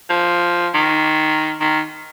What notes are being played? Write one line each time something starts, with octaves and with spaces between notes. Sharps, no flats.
F3
D#3
D#3